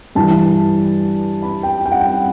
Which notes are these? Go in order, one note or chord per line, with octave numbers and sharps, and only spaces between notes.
G2 E3 A5
B5
G5
G5
F#5
G5